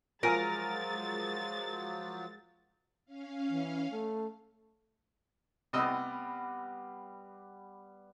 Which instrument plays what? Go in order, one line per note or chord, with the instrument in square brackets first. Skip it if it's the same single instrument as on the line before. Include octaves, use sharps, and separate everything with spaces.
[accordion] F3 F#3 [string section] G#3 A6 [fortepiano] F4 G#5 F6 [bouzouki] A#4
[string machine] C#4 F5
[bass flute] E3
A3
[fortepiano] C3 D#5 E6 [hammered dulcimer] G3 B3